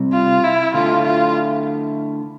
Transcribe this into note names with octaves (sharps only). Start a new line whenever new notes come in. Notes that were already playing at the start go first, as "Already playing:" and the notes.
Already playing: C3 G3 C4
F4
E4
D3 A3 E4 F4
F4